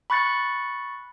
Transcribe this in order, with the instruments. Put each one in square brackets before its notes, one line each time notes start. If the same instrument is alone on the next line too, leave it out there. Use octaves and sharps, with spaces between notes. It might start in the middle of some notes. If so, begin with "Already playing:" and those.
[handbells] B5 C#6 F#6 A6 C#7